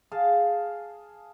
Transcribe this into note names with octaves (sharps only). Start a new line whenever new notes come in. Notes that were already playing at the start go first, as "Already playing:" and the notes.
G#4 F5 A5